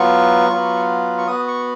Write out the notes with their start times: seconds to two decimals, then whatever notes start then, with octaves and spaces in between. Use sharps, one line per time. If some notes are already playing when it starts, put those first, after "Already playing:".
Already playing: F#3 B3 F4 C#6
0.49 F#3 B3 F4
1.18 C#6
1.27 B3 F#4 D#6
1.48 C#6